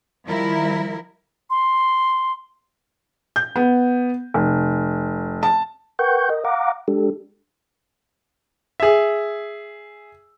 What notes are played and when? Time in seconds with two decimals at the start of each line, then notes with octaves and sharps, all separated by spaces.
0.25 D#3 F3 G3 E4 A#4
1.50 C6
3.36 G6
3.56 B3
4.34 F1
5.43 A5
5.99 A#4 B4 F#5 G5 C#6 G6
6.30 A#4 D#5
6.45 F5 F#5 A#5 D6
6.88 G#3 D4 G4 A4
8.80 G#4 E5